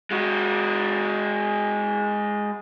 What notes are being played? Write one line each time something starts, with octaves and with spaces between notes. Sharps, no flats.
G#3 F#4